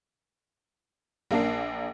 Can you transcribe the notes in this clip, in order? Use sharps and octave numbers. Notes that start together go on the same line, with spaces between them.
A#1 A#3 D4 A5 C7